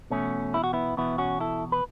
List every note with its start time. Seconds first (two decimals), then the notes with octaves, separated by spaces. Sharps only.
0.10 E2 B2 A3 C#4
0.54 E4
0.64 F#4
0.73 B3 E4
0.97 E2 B2 B3 E4
1.18 C#4 F#4
1.40 E4 A4
1.72 B4